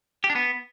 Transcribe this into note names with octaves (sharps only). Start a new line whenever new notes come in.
G4
D4
B3